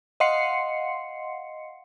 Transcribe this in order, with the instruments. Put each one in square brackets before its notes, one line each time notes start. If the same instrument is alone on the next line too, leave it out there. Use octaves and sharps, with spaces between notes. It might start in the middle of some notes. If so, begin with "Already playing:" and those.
[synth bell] D#5 F5 F#5 C6 C7 C#7